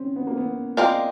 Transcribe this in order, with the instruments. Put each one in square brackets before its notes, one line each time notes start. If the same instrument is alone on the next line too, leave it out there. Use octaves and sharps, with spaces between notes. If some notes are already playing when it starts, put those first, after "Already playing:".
Already playing: [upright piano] C4 C#4
B3
A#3
B3
[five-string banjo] G#3 C4 F4 A#4 D5